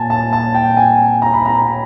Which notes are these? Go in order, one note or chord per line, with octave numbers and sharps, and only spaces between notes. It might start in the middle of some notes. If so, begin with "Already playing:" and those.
Already playing: A#2 G#5 A5
A5
A5
G5
G#5
A#5
B5
A#5